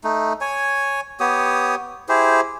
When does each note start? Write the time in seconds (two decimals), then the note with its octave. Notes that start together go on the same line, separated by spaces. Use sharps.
0.04 A3 D#4
0.41 C#5 G#5
1.20 B3 G4 C#5 D#6
2.09 E4 G4 G#4 C5